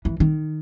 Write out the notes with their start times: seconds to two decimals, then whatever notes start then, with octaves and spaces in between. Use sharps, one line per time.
0.05 E3
0.20 D#3